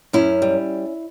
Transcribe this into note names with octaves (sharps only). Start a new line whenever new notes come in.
F#2 C#4 E4
G3